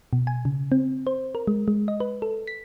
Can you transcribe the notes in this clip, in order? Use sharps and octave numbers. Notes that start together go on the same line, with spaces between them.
B2
G#5
C#3
C4
C5
A#4
G#3
G#3
D#5
B4
A4
B6